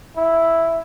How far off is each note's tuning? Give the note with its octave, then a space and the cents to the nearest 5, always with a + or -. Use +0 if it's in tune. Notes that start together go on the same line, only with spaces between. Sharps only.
E4 +0